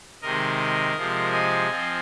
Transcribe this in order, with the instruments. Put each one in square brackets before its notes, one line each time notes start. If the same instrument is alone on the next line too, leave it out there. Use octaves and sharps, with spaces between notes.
[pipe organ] C3 D#3 G#3 A#4 D#5
C3 F3 G#3
D#5 G#5
F3 C4 F4